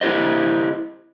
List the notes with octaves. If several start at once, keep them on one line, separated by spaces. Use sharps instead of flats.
E4 G4 C5 D#5